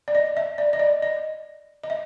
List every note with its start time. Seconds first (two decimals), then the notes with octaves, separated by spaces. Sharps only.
0.08 D5
0.15 D#5
0.37 E5
0.58 D5
0.73 D#5
0.79 D5
1.02 D#5
1.84 D#5
1.90 E5